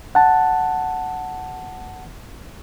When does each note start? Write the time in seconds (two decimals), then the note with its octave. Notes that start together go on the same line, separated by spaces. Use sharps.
0.15 F#5 A5